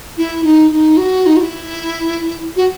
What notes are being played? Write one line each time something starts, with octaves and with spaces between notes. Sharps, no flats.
E4
D#4
D#4
F#4
D#4
F#4
E4
F#4